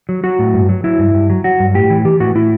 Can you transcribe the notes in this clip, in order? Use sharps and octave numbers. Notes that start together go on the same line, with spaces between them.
F#3
F#3 F#4
A2
G2
F#3
F#3 E4
G2
G2
F#3
F#3 F#4
G2
A2 G4
E3
E3 G4
A2 F#4
A2 E4